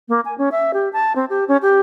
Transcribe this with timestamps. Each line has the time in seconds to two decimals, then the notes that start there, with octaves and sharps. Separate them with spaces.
0.09 A#3
0.25 G#5
0.38 C#4
0.52 E5
0.74 G4
0.93 A5
1.16 C4
1.30 G4
1.48 C#4
1.62 G4